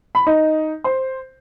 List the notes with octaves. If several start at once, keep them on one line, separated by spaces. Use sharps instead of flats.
B5
D#4
C5